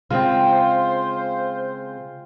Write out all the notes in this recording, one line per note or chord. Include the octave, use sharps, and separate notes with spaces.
C#3 G#3 C4 F4 C5 G5